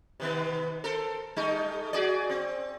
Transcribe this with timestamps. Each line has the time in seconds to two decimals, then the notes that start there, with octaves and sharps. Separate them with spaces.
0.20 C3 D#3 B3
0.84 A4 A#4 C5
1.36 G3 A3 D#4
1.93 F#4 G#4 D5
2.30 C4